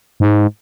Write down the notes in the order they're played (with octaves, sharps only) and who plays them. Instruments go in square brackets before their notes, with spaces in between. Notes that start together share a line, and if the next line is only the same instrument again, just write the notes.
[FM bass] G#2